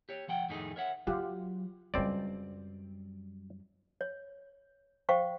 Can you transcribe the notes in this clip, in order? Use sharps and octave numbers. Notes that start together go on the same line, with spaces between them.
G4 C#5
D2 F3 F#5 G5
F2 A2 D#3 A3 D#4 G#4
A#4 C#5 E5 F#5
F#3 F4 G4 F#5
C#2 F#2 G3 C4 D5
C#5
C5 F5 G5 C#6